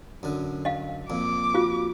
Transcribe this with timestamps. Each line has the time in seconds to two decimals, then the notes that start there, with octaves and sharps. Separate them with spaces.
0.23 F#2 D3
0.65 D#5 F5
1.10 F2 A#2 D6
1.54 F4 F#4 F5